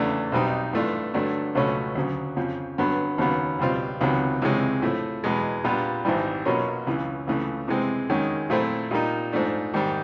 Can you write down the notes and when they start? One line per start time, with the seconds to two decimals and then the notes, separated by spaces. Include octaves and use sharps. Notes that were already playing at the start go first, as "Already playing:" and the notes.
Already playing: E2 C#3 E3 A3 D4
0.32 B1 B2 G3 C4 D#4
0.73 G2 E3 A3 D4 F4
1.14 G2 D3 F#3 A3 D4
1.55 C#2 B2 F#3 A3 C#4
1.95 D2 C#3 F#3
2.36 F2 C#3 F3
2.78 G2 D3 F#3 B3
3.18 D#2 C#3 F#3 B3
3.59 C#2 B2 G3 C4 F4
4.01 C#2 C3 D#3 F#3 B3
4.42 C#2 C3 E3 G#3 C#4
4.82 A2 F3 A3
5.24 E2 B2 G#3
5.64 A#2 G3 B3 D4 F4
6.05 G#1 G#2 E3 G3
6.45 B2 F#3 A#3 C#4 F4
6.87 C#2 C#3 E3
7.27 C#2 C#3 E3 A3
7.68 C3 E3 G#3 C4
8.10 F#2 D#3 G#3 C#4
8.50 A#2 F3 A3 C4 E4
8.91 A#2 G3 A#3 D#4
9.33 G#2 F3 A3 D4
9.74 G#2 D#3 G3